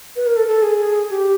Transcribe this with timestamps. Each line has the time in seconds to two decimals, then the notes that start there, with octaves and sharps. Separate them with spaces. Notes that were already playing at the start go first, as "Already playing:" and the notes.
0.16 B4
0.26 A#4
0.37 A4
0.48 A4
0.62 G#4
1.10 G4